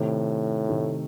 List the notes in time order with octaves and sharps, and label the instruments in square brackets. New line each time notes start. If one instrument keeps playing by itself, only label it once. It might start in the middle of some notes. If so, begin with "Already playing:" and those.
Already playing: [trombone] A2 [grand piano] C3 D#3 A3
[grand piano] C3 D#3 A3